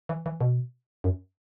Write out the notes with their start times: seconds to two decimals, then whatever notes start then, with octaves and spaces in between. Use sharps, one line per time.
0.09 E3
0.26 E3
0.41 B2
1.04 F#2